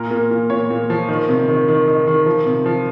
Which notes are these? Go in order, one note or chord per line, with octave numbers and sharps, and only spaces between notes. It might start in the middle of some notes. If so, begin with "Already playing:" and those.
Already playing: A#2 A#4
A#2
A#2
A#2 C#5
A#2
F3
D#3
C3
D#3
D#3
D#3
D#3
F3
C3
F3